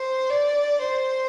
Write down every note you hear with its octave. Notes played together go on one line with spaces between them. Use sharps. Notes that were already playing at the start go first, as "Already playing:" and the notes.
Already playing: C5
D5
C5